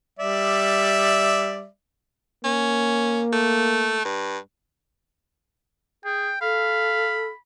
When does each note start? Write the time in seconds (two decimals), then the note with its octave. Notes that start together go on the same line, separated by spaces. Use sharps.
0.19 G3 D5 E5
2.45 A#3 C#4
3.33 A3
4.05 G2
6.05 G#4 G5
6.41 A4 F5 B5